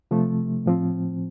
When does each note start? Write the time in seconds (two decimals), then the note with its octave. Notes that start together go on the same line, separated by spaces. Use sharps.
0.11 C3 F3 A3
0.66 A2 F3 C4